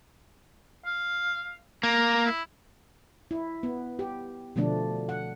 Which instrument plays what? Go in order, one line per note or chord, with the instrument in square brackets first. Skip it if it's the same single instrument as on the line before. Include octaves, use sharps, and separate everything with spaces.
[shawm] F5
[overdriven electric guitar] A#3 [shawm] A#5
[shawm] E4
[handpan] E4
B3
G4
B2 D3 F3 A3 D4
F#5